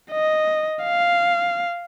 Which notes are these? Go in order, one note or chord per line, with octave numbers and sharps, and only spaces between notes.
D#5
F5